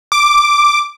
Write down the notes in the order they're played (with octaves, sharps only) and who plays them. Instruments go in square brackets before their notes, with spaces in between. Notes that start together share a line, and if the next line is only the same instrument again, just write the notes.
[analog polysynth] D6